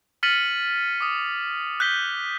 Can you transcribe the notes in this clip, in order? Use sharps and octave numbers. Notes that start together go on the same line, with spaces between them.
F6 A6 B6 C#7 D#7 F#7
D6 D#6
F#6 G6 B6 G7